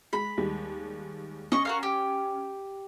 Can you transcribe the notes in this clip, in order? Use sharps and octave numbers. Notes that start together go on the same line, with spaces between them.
G#3 B5
D#2 G3 G#3
C#4 D#5 C#6
F#4 A#4 F5
G4